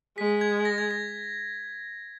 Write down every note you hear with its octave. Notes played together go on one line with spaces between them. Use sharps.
G#3 B6
G#6
A#6
G#6
A#6